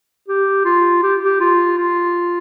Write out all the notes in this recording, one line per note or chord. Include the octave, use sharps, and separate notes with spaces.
G4
F4
G4
G4
F4
F4